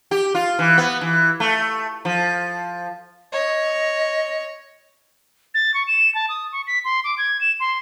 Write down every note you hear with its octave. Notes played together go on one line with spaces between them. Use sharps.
G4
F4
E3
B3
E3
A3
F3
C#5 D#5
A6
C#6
E7
A5
D#6
C#6
B6
C6
D6
G#6
E7
C6